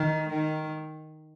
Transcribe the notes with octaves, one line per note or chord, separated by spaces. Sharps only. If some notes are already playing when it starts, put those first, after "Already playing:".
Already playing: D#3
D#3